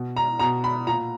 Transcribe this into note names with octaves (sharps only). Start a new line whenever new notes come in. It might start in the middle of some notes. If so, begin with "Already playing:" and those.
Already playing: B2
A#5
B2 A#5
B5
A#2 A#5